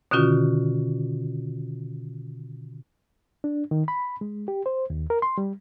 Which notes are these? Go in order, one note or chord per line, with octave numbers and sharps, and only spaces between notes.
B2 D3 D#3 C#4 F4 F#4
D4
D#3
B5
G#3
G4
C5
D#2
A#4
C6
G3